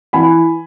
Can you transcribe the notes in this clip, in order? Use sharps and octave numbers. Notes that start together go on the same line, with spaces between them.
E3 G#5 B5